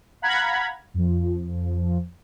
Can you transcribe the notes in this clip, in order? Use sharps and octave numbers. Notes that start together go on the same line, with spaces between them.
F5 F#5 A#5 B5 G#6
F2 F3